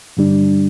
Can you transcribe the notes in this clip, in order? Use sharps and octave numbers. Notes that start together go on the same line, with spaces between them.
G2 D3 G3 D4